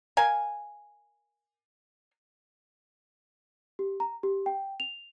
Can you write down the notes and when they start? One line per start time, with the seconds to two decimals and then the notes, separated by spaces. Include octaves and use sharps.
0.17 A#4 F5 G#5
3.79 G4
4.00 A#5
4.23 G4
4.46 G5
4.80 F7